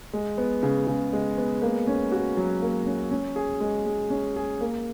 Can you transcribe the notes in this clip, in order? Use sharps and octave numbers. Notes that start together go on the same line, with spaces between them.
G#3
B3
C#3
C#3
G#3
B3
A#3
C#4
F#4
F#3
A#3
C#4
C#4
G#4
G#3
G#3
C#4
G#4
A#3